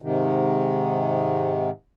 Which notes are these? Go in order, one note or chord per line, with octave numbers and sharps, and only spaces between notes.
G#2 C3 D#3